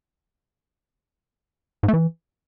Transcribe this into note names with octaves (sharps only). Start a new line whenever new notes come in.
G#2
A3
E3